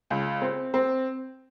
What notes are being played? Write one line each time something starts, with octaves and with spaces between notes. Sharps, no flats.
C#2
C4
C4